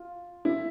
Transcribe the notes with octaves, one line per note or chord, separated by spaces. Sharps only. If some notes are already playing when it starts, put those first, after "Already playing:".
Already playing: F4
E4